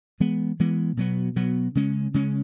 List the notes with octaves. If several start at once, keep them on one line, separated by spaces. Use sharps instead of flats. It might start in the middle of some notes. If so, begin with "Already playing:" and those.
E3 G#3 B3
E3 G#3 B3
B2 F#3 B3
B2 F#3 B3
C#3 G#3 C#4
C#3 G#3 C#4